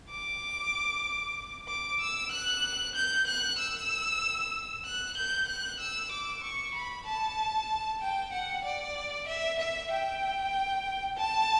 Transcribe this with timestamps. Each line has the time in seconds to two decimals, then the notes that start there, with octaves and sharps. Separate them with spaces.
0.10 D6
1.68 D6
2.00 E6
2.31 F#6
2.95 G6
3.27 F#6
3.58 E6
4.85 F#6
5.17 G6
5.48 F#6
5.80 E6
6.11 D6
6.43 C#6
6.74 B5
7.06 A5
8.01 G5
8.32 F#5
8.64 D5
9.28 E5
9.59 E5
9.91 G5
11.17 A5